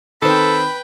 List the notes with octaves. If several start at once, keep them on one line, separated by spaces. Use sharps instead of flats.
D#3 C4 A4 B4 G5 B5